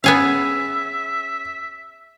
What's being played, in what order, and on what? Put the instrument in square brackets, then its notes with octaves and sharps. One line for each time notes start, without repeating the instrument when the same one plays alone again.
[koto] B3 G#4 F5 [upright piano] C#4 [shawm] E5